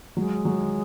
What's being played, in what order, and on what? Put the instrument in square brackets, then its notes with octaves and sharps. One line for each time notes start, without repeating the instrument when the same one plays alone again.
[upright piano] F#3 [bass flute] G#3
[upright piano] F#3